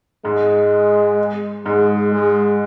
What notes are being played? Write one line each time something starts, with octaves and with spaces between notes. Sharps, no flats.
G#2 G#3
G#2 G#3
G#3